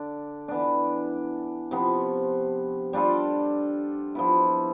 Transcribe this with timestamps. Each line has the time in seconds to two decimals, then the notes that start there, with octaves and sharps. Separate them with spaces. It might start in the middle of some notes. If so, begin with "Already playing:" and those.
Already playing: D3 D4
0.48 E3 B3 D4
1.71 C3 F3 B3
2.93 G3 D4 F4 A4
4.15 F3 B3 E4